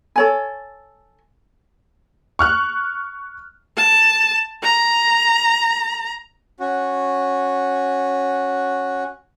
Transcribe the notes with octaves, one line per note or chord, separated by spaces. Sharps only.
A4 C#5 G#5
C#6 F6 F#6
A5
A#5
C#4 F#4